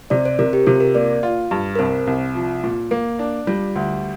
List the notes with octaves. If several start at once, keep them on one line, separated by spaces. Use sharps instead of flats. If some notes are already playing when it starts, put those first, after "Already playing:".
C3 D5
C5
C3 A#4
G4
C3 F4
A#4
A#3 D5
F4
G2
A#4
C2 C5
C2
F3
A#2
A#3
D4
G3 F4
D2